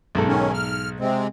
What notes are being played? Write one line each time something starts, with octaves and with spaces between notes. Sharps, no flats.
B1 G#2 A4
D#3 C#4
F6
C3 G#3 C4